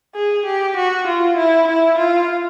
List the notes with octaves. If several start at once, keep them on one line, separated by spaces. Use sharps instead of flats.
G#4
G4
F#4
F4
E4
E4
F4